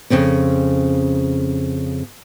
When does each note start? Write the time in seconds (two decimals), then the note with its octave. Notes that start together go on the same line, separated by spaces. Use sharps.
0.10 F2 C#3 C4 C#4